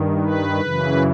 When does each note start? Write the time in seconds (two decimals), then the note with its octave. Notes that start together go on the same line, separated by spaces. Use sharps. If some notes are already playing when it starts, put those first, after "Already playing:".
Already playing: G2 D#3
0.21 B4
0.60 F#2 C#3 E3